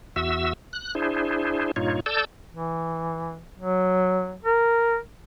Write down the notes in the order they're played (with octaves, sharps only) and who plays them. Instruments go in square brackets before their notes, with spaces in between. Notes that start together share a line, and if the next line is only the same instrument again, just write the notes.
[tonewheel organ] E2 F#4 E5 E6
F#6
D4 E4 G#4 C5
G2 A#2 D#4 F4 C#5
A4 D5 A5 E6 G6
[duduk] E3
F#3
A#4